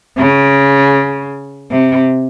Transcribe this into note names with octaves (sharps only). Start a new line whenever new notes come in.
C#3
C3